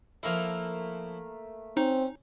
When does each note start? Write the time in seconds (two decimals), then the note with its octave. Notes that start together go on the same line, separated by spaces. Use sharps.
0.23 F3 A3 A#3 E4 A#4
1.77 C4 C#4 D#4